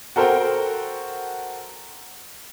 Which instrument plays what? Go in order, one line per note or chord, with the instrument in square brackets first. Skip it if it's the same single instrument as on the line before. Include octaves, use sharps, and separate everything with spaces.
[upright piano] F#4 A4 A#4 C5 G5